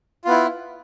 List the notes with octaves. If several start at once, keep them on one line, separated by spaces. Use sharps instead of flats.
B3 E4 F4